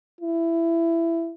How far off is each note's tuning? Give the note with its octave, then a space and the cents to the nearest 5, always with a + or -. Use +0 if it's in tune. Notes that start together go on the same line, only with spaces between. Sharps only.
E4 +15